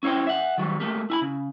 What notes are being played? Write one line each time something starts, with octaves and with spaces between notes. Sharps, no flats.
C#4 E4 C5 C#5 G5
E5 F#5
D#3 F#3 G3
A3 A#3 G4
E4 G#5 B5
C#3